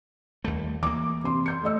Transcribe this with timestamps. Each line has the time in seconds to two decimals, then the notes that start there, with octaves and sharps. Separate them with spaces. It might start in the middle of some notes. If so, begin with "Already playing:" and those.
0.44 D#2 G3 A3
0.83 E3 A#3 D6
1.24 C3 C6
1.46 C6 G6 C#7
1.64 A3 D#5 E6